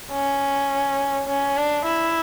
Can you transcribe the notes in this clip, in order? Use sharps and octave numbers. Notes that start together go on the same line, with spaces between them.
C#4
C#4
D4
E4